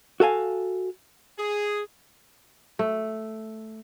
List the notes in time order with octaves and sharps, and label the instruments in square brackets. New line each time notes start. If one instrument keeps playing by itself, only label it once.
[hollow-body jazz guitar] F#4 A4 F5 G#5
[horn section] G#4
[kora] A3